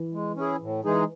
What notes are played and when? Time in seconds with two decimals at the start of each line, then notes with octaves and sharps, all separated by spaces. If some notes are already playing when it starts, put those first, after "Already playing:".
Already playing: E3
0.13 G#3
0.36 C#4 E4 G#4
0.61 A2
0.85 E3 G#3 D#4 G#4